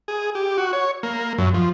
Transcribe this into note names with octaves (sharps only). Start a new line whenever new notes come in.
G#4
G4
F#4
C#5
A#3
F#2
F3